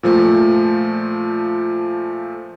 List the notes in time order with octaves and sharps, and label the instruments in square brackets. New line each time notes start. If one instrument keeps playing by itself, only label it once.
[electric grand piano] A#2 F3 A3